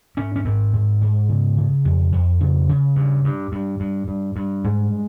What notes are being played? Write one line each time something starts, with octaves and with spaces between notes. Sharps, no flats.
G#2 C#4
C#4
G#2 C4
G#2
G#2
C#3
C#3
F2
F2
C#3
C#3
G2
G2
G2
G2
G2
G2
G#2 G#3